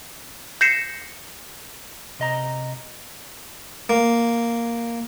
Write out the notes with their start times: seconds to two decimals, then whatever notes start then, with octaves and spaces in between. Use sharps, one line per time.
0.61 G6 A#6 C7 C#7 E7
2.19 C3 D#5 A#5
3.90 A#3